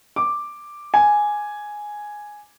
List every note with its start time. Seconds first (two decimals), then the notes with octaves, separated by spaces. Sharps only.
0.16 D6
0.94 G#5